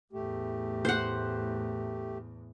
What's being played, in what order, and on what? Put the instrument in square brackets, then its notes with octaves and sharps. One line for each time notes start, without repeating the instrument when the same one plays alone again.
[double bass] E2 A2 [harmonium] A3 G4
[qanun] C5 F#5